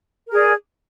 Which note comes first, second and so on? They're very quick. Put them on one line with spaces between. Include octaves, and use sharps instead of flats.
A#4 G#4 D5